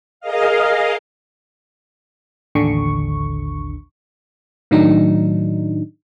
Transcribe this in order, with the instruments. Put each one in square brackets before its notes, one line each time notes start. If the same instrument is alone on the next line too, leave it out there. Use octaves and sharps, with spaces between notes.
[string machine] G#4 A#4 D#5 F5
[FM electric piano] A1 D#2 D3 C#6
A2 D#3 F#3 D4 D#4